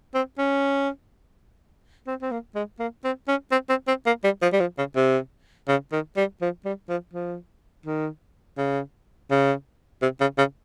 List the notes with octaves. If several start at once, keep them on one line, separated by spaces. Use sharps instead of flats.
C4
C#4
C4
C4
A#3
G#3
A#3
C4
C#4
C4
C4
C4
A#3
G3
F3
G3
F3
C#3
C3
C#3
D#3
G3
F3
G3
F3
F3
D#3
C#3
C#3
C3
C#3
C#3